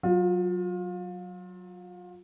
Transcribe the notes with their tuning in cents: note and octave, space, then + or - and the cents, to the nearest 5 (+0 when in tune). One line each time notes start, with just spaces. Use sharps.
F#3 +0 F4 +30